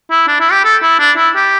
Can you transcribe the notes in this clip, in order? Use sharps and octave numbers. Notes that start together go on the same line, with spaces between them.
E4
D4
E4
G4
A4
E4
D4
E4
G4